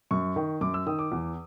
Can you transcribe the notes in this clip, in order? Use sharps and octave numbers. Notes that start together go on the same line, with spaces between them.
F#2 C#6
D#3
F#2 D6
E6
D#3 D#6
D6
E2